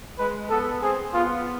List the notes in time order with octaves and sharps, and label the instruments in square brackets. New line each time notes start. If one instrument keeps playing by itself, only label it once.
[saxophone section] G#3 [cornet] B4
[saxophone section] B3 [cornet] A4
[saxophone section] C4 [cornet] G#4
[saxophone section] B3 [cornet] F4